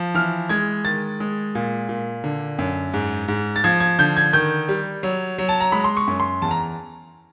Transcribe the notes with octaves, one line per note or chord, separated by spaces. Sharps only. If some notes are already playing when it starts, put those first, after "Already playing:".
Already playing: F3
E3 F6
G#3 G#6
D#3 A6
G#3
A#2
A#2
D3
F#2
G#2
G#2
A6
F3 G#6
G#6
D3 G6
G#6
D#3 G6
G3
F#3
F#3
A5
A#5
G#3 B5
C6
C#6
F#2
C6
E2 A5
A#5